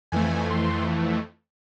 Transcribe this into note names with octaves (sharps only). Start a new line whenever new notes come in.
F2 E3 A3 G#5
C6